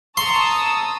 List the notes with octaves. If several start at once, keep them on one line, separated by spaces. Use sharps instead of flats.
A5 A#5 C6 C#6 D#6 E6